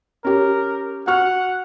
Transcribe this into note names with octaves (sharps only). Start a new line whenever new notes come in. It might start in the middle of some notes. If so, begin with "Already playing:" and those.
C#4 G4 A#4
F#4 F#5 C#6 F6